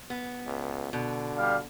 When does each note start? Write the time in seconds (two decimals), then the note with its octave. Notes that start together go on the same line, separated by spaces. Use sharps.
0.10 B3
0.46 C#2
0.93 B2 D3
1.38 G3 F5